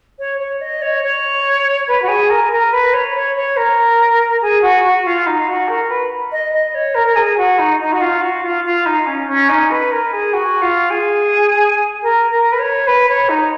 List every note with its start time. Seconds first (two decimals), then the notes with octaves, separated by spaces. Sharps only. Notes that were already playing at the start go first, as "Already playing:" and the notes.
0.18 C#5
0.39 C#5
0.60 D#5
0.81 C#5
1.02 C#5
1.87 B4
2.01 F#4
2.08 G#4
2.29 A#4
2.50 A#4
2.72 B4
2.93 C#5
3.14 C#5
3.36 C#5
3.56 A#4
4.41 G#4
4.61 F#4
4.83 F#4
5.05 F4
5.26 D#4
5.47 F#4
5.67 A#4
5.89 B4
6.31 D#5
6.52 D#5
6.74 C#5
6.94 A#4
7.06 A#4
7.15 G#4
7.37 F#4
7.58 D#4
7.80 D#4
7.92 F#4
8.00 F4
8.21 F#4
8.42 F4
8.64 F4
8.85 D#4
9.06 C#4
9.27 C#4
9.48 D#4
9.70 B4
9.91 A#4
10.12 G#4
10.33 F#4
10.61 F4
10.90 G#4
12.02 A#4
12.30 A#4
12.52 B4
12.59 C#5
12.86 B4
13.08 C#5
13.28 D#4